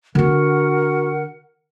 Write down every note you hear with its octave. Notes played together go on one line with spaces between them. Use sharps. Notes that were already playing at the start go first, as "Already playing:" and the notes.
D3 D4 F#4 A#4 F#5